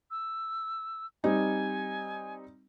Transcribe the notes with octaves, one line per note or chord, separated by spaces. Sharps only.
E6
G3 C4 D#4 G#5